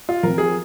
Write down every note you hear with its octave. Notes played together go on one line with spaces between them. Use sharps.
F4
F3 C4 A#4
G#4